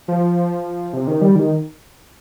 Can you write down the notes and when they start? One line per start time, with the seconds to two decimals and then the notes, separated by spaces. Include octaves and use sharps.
0.08 F3
0.93 C3
1.07 D#3
1.21 G3
1.36 D#3